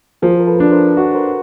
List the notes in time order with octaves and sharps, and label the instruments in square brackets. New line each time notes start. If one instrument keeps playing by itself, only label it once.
[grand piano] F3 [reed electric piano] G#4 A#4
[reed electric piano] A#4
A4 B4
[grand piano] D4
[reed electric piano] A#4 C5
[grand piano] F#4
[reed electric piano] A#4 C5